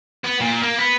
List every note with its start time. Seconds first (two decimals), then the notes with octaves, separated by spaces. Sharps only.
0.24 B3
0.40 A#2
0.62 A#3
0.78 B3